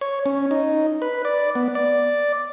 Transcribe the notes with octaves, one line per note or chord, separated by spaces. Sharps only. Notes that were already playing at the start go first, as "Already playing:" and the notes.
C#5
C#4
D#4
B4
D5
B3
D5